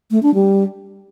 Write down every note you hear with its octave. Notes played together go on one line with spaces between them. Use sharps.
A3
D4
G3